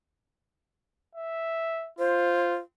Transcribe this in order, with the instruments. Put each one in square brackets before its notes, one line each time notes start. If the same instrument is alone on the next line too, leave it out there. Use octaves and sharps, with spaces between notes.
[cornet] E5
[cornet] F4 [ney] C5